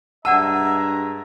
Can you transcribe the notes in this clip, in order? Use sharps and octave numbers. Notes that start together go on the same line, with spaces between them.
G2 G#3 D5 E5 F#5 A5 A#5 E6